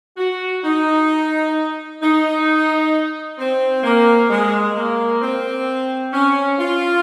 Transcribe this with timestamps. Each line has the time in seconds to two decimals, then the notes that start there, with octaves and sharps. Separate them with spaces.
0.18 F#4
0.64 D#4
2.01 D#4
3.39 C4
3.84 A#3
4.30 G#3
4.75 A#3
5.21 C4
6.12 C#4
6.59 F4